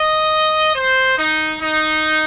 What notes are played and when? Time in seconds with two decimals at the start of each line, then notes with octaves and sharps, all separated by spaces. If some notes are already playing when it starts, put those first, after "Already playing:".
Already playing: D#5
0.75 C5
1.18 D#4
1.61 D#4